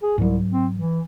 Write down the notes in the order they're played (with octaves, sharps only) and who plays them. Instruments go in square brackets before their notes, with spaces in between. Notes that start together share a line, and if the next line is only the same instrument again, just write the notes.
[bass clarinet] G#4
[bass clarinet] C2 [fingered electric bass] G#2 F#3
[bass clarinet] C4
E3